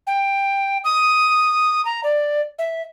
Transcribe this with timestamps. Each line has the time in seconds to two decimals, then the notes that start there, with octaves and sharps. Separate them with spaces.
0.07 G5
0.84 D#6
1.85 A#5
2.04 D5
2.59 E5